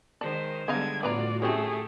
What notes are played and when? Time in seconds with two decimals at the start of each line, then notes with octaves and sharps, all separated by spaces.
0.21 D#3 G#3 C5 D5 A5
0.68 D3 G3 G#3 B3 D#4 F5 G#6
1.03 A2 B3 F4 F#4 B4 D5 A#5
1.42 A3 C4 C#4 G4 G#4 C#5